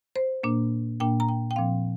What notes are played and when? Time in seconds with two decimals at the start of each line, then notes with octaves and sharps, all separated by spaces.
0.16 C5
0.43 A#2 A#3 D4
1.00 A#2 A#3 D4 G5
1.20 A#5
1.29 G5
1.51 G5
1.56 A#2 F3 C4 F5